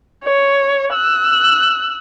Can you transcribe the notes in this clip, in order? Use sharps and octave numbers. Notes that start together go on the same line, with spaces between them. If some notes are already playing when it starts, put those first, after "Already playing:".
C#5
E6 F#6